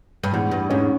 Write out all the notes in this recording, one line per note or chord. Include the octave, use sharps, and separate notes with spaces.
G2
E2 G#2
G2
G#2 C#4